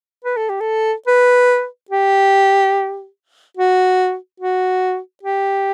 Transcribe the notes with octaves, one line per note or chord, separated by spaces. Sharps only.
B4
A4
G4
A4
B4
G4
F#4
F#4
G4